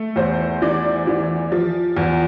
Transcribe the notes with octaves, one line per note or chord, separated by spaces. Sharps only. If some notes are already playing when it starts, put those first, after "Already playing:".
Already playing: A3
E2 C5
E3 D5
E3
F3
E2